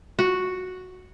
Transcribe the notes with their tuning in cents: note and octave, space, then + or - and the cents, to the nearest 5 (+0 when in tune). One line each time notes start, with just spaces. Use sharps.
F#4 -5